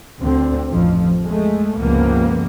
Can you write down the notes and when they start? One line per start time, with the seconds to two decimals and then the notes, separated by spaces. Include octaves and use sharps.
0.21 D2 D3 C4
0.70 A1 F2 F3
1.24 G#3 A3
1.79 C#2 G2 C3 F3 A#3 B3